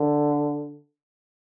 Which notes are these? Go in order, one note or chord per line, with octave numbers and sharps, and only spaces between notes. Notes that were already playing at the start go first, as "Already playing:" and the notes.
Already playing: D3